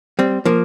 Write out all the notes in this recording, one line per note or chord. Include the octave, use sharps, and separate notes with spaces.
G3 C4
F3 A#3